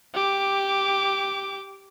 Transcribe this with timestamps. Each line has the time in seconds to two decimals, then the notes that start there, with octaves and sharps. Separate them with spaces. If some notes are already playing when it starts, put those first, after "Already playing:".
0.14 G4 D6